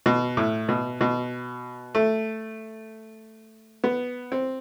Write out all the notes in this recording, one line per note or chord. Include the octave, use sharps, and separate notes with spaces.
B2
A2
B2
B2
A3
B3
C4